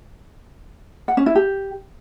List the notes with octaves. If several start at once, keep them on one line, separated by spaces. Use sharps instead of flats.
F#5
C#4
E4
G4